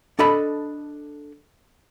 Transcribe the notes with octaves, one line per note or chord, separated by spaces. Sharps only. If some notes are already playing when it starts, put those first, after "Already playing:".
D4 A4 D#5 B5